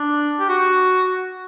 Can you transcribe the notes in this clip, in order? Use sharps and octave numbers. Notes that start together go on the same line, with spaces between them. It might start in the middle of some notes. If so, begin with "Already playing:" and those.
Already playing: D4
G4
F#4